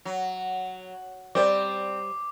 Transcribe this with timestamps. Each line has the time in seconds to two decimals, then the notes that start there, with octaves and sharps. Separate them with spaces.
0.05 F#3
1.35 G3 C4 C5 D5 D6